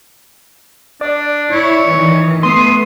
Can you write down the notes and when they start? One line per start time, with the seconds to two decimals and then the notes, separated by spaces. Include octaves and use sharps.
1.01 D4 D5
1.51 E4 C#5
1.90 D#3 E3
2.43 A3 B3 C6 D#6 C7